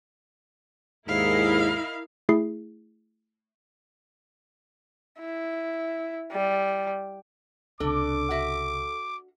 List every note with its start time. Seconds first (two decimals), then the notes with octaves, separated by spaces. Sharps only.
1.08 D#2 G#2 G#3 E4 A#4 D#5 F5
2.29 A3 E4 G#4 C7
5.20 E4
6.32 G3
7.80 C#2 C3 D4 A4 D6
8.30 F#4 E5